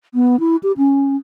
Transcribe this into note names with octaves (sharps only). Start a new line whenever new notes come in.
B3
E4
G4
C#4